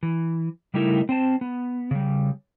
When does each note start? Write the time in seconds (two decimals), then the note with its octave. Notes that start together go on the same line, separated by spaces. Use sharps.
0.03 E3
0.74 C#3 G3 A3 D#4 E4 A#4
1.09 C4 C5 A5
1.41 B3
1.91 C#3 G3